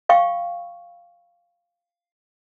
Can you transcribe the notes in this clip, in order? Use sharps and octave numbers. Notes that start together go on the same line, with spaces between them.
F5 G5 C#6